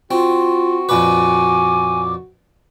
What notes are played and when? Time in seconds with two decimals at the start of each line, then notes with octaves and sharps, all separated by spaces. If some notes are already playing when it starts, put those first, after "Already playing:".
0.11 C4 F4 F#4
0.89 F2 A#2 B4 G#5 D6